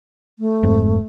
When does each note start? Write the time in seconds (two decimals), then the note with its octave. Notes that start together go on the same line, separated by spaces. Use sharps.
0.39 A3
0.63 F1 G#2 C4